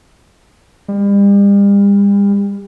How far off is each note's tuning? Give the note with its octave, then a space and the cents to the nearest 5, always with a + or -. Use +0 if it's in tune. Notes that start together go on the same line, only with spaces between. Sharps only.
G3 +40